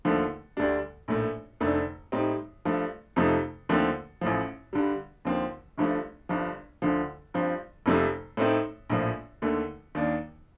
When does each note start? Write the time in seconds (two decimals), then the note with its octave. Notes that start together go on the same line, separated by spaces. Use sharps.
0.05 D#2 D3 F3 A3
0.57 D2 D3 G3 D4
1.08 A#1 A2 A3
1.60 F1 F2 D3 A3 D4
2.12 A2 G3 C4 D#4
2.65 G2 F3 A3
3.16 F2 C3 F3 A3 D#4
3.69 D#2 D3 F3 A3 C4
4.21 A1 A2 F3
4.73 G2 D3 G3
5.25 D#2 D3 F3 C4
5.78 G1 G2 F3 A3
6.29 G1 G2 F3
6.82 D2 D3 F3
7.34 G2 F3 C4
7.86 F1 F2 C3 F3 A3
8.37 A2 A3 C4 D#4
8.89 A#1 A2 F3
9.42 D#2 D3 A3
9.95 D#2 D#3 A#3 D4